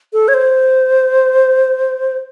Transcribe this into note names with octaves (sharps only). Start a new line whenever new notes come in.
A4
C#5
C5